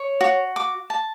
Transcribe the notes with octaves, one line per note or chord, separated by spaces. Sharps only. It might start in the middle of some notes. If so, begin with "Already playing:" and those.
Already playing: C#5
F#4
D6
A5